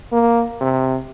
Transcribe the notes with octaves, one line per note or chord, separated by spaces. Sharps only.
A#3
C3